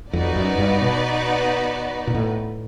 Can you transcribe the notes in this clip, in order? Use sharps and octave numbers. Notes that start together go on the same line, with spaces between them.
F2 B3 D#4 F#4 B4 D5
F#2
G2
B2
A#2
A2